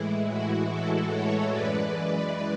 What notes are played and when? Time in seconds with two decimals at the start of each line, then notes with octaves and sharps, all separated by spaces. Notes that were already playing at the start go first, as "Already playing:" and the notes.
Already playing: A2 E3 G#3 E4
0.30 F#4
0.70 F#4 A4
1.11 A4 C#5
1.53 F#2 E3 G#3 B4 D5